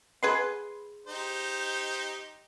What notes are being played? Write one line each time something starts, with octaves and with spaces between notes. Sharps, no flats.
G#4 B4 C6
D#4 G4 C5